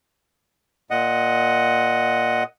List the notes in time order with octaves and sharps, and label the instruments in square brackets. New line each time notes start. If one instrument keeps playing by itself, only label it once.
[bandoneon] A#2 D#5 F#5